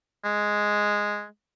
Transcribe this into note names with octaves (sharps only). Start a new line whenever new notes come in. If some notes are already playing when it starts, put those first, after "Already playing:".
G#3